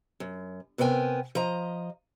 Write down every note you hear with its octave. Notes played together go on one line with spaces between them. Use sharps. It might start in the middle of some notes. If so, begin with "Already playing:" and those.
F#2
C3 B3 A#4 G5 G#5
F3 D#5 A#5